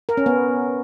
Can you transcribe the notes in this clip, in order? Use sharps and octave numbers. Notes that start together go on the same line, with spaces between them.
A#4
C#4
B3